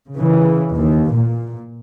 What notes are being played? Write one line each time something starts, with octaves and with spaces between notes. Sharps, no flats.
C#3 E3
D#2
A#2